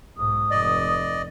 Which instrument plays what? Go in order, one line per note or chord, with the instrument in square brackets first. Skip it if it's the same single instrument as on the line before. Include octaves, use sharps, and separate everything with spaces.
[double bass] B1 G#2 [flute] D#6
[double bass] F1 [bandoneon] D5 D#5